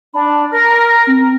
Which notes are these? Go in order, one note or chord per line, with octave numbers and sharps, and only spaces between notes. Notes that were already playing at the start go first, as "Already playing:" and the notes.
D4 B5
A#4 F6
C4